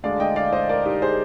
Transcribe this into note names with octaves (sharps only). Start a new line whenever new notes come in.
D2 D3 G#3 D5 F5
D#5 G5
D5 F5
C5 D#5
A#4 D5
D#4 G4
G#4 C5